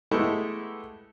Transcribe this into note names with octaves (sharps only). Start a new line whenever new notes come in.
G#3 A3 B3 E4 G4 A4